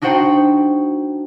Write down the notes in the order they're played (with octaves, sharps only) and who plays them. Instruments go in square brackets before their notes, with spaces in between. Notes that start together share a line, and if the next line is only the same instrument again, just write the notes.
[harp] D4 D#4 F#4 C5 F#5 G5